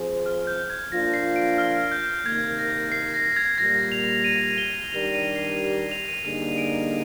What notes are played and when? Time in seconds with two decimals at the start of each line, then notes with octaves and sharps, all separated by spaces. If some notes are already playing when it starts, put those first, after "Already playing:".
Already playing: F3 C4 F4 G#4 C5
0.26 F6
0.47 G6
0.70 G#6
0.91 F3 A#3 D4 F4 A#6
1.14 C7
1.36 D7
1.58 F6
1.92 G6
2.26 C3 D#3 A#3 G#6
2.59 A#6
2.92 C7
3.14 A#6
3.36 G#6
3.58 A#2 G3 A#3 A#6
3.92 F7
4.24 D#7
4.58 G7
4.92 D#3 G3 D4 G4 A#4 F7
5.14 D#7
5.36 C7
5.58 F7
5.75 F7
5.91 F7
6.08 D#7
6.25 D3 G3 A#3 D#4 G#4 D#7
6.58 D7